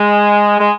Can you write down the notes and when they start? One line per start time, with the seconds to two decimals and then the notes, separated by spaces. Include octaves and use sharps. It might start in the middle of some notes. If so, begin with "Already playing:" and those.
Already playing: G#3
0.59 G#3